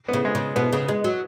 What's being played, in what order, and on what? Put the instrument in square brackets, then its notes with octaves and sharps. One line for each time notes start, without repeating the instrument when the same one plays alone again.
[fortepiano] B3
[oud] C#3
[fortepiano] G#3
[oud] C#3
[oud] B2 [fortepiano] B3
[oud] C#3
G#3
F#3